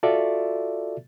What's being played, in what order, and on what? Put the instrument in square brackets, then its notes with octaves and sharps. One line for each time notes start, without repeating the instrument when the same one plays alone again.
[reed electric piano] F4 F#4 A4 D5 E5